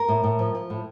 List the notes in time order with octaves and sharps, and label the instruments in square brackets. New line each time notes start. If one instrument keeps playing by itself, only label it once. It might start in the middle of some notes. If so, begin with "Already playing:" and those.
Already playing: [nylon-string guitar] A#4
A2
A2
F3
F3
A2